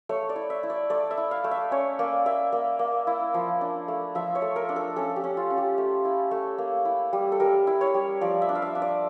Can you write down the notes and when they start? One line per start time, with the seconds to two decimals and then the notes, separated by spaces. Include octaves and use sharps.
0.09 A3 C#5
0.29 D5
0.36 E4
0.50 E5
0.63 E4
0.70 D5
0.90 A3 D5
1.11 E5
1.18 E4
1.31 F5
1.44 A3
1.51 E5
1.71 C#4 C#5
1.99 A#3 D5
2.26 A#3 E5
2.52 A#3
2.79 A#3
3.07 E4
3.34 F3
3.61 D4
3.88 A3
4.15 F3 E5
4.35 C#5
4.42 A3
4.56 A#4
4.69 D4
4.76 A4
4.96 C#4 A4
5.16 G4
5.24 C#4
5.37 F4
5.50 C#4
5.58 G4
5.78 A3
6.05 E4
6.31 A3
6.58 A#3
6.85 E4
7.13 G3
7.32 A4
7.40 G3 A#4
7.67 E4
7.81 C#5
7.94 G3
8.21 F3 D5
8.42 E5
8.49 D4
8.55 F5
8.62 E5
8.75 D4
8.82 D5